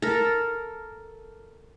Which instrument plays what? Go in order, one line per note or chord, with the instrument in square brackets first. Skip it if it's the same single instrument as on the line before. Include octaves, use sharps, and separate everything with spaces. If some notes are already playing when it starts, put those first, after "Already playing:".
[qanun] A4 A#4